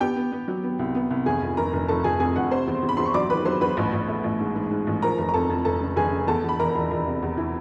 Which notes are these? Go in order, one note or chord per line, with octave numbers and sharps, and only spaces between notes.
B3 G4 G5
B3
B3
F#3
B3
C2
B3
C2
F1 G#4 G#5
F2
F1 A#4 A#5
F1
F1 A4 A5
F1 G#4 G#5
F2 G#4 G#5
F1 F#5
C3 C5 C6
E2
E2
B5
E2 C6
C#6
F#3 D5 D6
D#3 B4 B5
F#3 C5 C6
E2 B4 B5
A1
A1
A3
A1
G#2
G#2
G#2
A1
F3 A#4 A#5
F1
A#5
F2 A4 A5
F2
F1 A4 A5
C#3
F1 G#4 G#5
C#3
E2 A4 A5
E2 B5
E1 A#4 A#5
E1
E1
C3
E2
E3